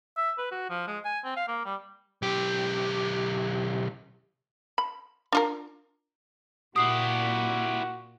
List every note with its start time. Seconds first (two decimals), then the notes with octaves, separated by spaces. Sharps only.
0.17 E5
0.38 B4
0.51 F#4
0.69 F3
0.87 G#3
1.05 G#5
1.24 C4
1.36 F5
1.48 A#3
1.65 G3
2.22 B1 G4
4.78 B5
5.32 D4 F4 A#4
6.76 A#2 E4 F#4 G4 D#6 C7